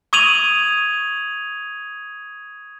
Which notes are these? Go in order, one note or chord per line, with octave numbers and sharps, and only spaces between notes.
C#6 D#6 G#6 D#7 F7 F#7